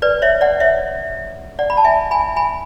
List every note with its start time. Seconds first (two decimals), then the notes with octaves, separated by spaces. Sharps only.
0.02 B4 D5
0.22 C#5 E5
0.41 D5 F#5
0.60 C#5 E5
1.59 D5 F#5
1.70 B5
1.77 A5
1.84 E5 G#5
2.11 G#5 B5
2.36 G#5 B5